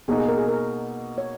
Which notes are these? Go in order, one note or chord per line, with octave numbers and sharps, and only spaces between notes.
B2 A#3 D#4 G#4
G#4
A#4
G#4
A#4
C#5